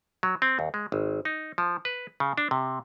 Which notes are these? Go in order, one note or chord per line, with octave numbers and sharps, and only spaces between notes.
F#3
C4
D#2
G#3
G#1
D#4
F3
B4
C#3
D4
C3